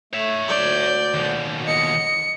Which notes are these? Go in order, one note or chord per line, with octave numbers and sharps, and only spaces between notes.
A3 C#5 E5
D2 D5 G6
D#2 B2
D#5 C#7